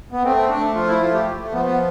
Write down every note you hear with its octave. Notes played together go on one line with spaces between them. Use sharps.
B3
A3 C4
C4
A3 D4
F3 F4
E4
A3 F4
G4
A3
A3
F3 B3
B3